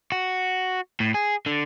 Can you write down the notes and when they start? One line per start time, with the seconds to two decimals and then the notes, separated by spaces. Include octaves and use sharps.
0.12 F#4
1.00 A2
1.14 G#4
1.46 D3